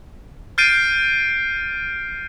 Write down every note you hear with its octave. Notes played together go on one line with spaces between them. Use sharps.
F6 G6 A6 C7 D7 D#7